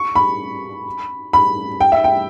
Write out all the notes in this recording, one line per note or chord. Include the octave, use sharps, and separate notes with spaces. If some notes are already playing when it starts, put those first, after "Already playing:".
Already playing: C#6
B5
B5
G5
E5
G5